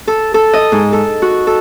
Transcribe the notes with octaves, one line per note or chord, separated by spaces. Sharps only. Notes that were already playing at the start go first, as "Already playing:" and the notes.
A4
A4
D#5
G#2
A4
F#4
A4